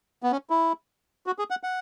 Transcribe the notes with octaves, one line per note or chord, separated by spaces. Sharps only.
B3
C#4
E4
F#4
G#4
F#5
F#5